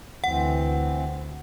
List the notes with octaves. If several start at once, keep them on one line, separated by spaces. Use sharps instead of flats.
D2 E3 C4 F#5